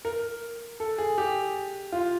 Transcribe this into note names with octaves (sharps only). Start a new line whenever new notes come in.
A#4
A4
G#4
G4
F4